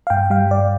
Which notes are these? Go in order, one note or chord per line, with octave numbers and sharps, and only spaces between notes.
F5
G2 G5
G3 F5
G2 D5